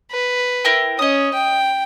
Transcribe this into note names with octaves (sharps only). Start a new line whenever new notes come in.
B4
E4 A#4 G5
C#4 D#5 D#6
G5